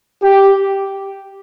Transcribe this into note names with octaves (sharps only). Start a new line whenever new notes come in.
G4